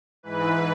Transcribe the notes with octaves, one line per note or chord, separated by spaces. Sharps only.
G#2 E3 B4